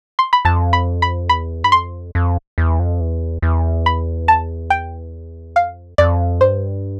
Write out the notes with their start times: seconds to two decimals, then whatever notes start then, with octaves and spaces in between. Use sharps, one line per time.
0.19 C6
0.33 B5
0.45 F2 A5
0.73 B5
1.02 B5
1.29 E2 B5
1.64 G2 B5
1.72 F2 C6
2.15 F2
2.58 E2
2.79 F2
3.01 E2
3.42 E2
3.86 B5
4.28 A5
4.70 G5
5.56 F2 F5
5.98 F2 D5
6.40 G2 C5